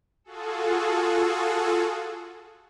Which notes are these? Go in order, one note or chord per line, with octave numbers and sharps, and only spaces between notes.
F4 F#4 G#4 A4